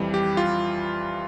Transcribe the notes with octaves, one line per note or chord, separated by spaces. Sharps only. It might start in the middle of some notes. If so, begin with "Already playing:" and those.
Already playing: F2 E3 G3
G4
F4